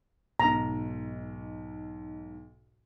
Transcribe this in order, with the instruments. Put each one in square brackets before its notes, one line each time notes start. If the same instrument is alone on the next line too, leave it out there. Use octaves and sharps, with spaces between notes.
[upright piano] B1 G#2 [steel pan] A#5